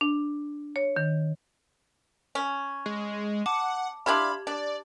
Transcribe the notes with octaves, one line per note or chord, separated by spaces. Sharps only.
D4
C#5
D#3
C#4
G#3
F#5 A5 D6
D4 E4 F4 G4 B5 G#6 F#7
D4 D5